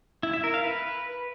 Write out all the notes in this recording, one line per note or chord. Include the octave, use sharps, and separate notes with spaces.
E4
E5
A#4
F5
B4